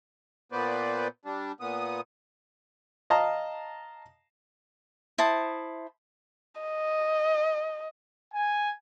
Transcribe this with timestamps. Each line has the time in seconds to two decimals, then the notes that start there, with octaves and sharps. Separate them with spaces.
0.52 A#2 B3 B4 C5 D5
1.25 G3 D4
1.60 A#2 B3 D#6
3.10 D#5 F5 A5 A#5
5.18 E4 C5 A5 D#6
6.61 D#5
8.34 G#5